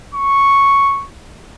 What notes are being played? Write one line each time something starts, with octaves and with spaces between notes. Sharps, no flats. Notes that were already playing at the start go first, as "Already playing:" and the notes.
C#6